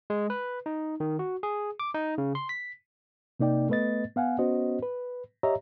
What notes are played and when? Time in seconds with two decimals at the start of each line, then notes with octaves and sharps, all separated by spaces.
0.10 G#3
0.30 B4
0.66 D#4
1.00 D#3
1.19 F#4
1.43 G#4
1.80 D6
1.94 D#4
2.18 C#3
2.35 C6
2.49 B6
3.40 C3 A#3 D#4 D5 G5
3.69 A3 B3 B4 D#5 A6
4.16 B3 F5 F#5 G#5
4.39 B3 C#4 F#4 C5 D#5
4.83 B4
5.43 G4 C#5 D#5 E5 A#5